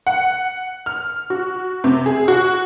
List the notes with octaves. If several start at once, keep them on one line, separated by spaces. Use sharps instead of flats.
F#5
F6
F#4
C3
G#4
F#4